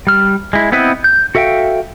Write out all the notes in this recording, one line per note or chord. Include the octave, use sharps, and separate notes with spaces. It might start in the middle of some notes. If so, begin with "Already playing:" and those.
G3 F6
G#3 E4
B3 C4 E4 B4 D#5
G6
F#4 A4 E5 F5 G5